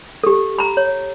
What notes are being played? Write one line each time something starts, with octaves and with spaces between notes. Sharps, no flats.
G4 A4
A#5 B5
C#5